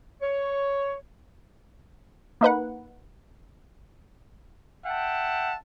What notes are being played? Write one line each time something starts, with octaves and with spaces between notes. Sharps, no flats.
C#5
A#3 D#4 B4 F#5
E5 F#5 G5 A5